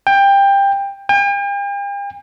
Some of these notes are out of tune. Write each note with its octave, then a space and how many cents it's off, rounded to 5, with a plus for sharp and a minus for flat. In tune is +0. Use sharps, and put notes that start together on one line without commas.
G5 +20
G5 +45